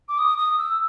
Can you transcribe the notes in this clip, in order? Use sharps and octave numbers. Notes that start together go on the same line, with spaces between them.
D6
D#6
D#6
E6